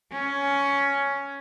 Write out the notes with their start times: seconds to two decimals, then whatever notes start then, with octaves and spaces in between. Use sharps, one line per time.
0.12 C#4